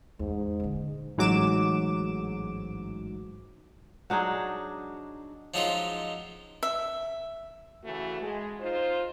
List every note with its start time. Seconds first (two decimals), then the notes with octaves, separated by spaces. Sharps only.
0.19 E2 G#2
0.60 D#1 D3
1.17 A1 G#2 F#3 D6 E7
4.10 F#3 D4 D#4 G#4
5.54 F3 F#3 G#3 C#4 D#4 F4
6.63 E5
7.84 C#3 E3 A3 F#4
8.22 G#3
8.60 D#4 F4 C5